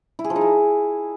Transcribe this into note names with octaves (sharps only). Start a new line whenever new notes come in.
E4
G#4
F3
D#4
E4